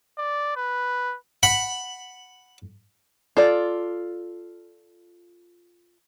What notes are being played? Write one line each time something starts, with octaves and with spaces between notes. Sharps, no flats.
D5
B4
F#5 B5
F4 A4 D5